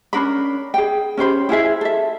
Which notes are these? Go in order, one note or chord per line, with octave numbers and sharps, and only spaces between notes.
C#4 D4 A#4 B5
G#4 G5
C#4 G4 C5 B5
E4 F4 G#4 E5
A4 E5